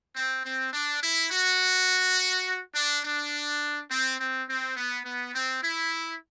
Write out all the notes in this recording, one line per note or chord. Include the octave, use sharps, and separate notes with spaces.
C4
C4
D4
E4
F#4
D4
D4
C4
C4
C4
B3
B3
C4
E4